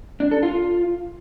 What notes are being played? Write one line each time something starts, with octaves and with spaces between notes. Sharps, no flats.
D4
A4
F4